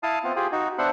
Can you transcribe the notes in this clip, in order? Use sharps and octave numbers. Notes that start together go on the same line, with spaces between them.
E4 F5 A5 D#6
B3 C4 F4
F4 G4 G#4
D#4 F#4
B3 D4 C5 E5 F#5 B5